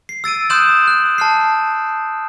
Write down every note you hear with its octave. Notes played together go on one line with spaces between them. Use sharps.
C7
E6 A6 D7 D#7
C6 D#6 F#6 G6 E7 F#7
F#6
A5 F6 C7